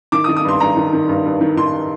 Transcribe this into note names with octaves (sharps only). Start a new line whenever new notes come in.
D#3 D6
D#6
D#3
D#6
G2 C6
G2 A#5
D#3
D#3
G2
G2
D#3
D#3 C6